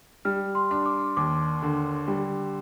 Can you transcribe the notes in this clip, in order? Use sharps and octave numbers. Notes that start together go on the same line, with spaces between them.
G3 F6
C6
D4
D6
D#2 D6
D3
G3